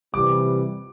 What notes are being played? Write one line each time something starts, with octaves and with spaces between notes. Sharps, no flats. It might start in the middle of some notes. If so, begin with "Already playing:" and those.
C3 E3 G3 D6